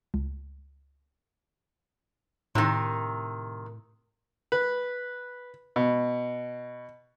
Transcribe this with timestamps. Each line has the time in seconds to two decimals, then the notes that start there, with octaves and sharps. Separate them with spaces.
0.14 C#2
2.55 A2 C3 D#3
4.52 B4
5.76 B2